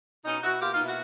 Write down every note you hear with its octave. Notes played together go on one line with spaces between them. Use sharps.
B2 C#4 D#4
B2 E4 F#4
A#3 F4 G4
D#4 F4
B2
E4 F#4